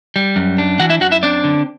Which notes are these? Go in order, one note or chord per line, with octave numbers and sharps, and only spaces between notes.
G3
F#2
D4
E3 F#4 F#5
E4 E5
F#2 F#4 F#5
E4 E5
C4 D4 D5
D3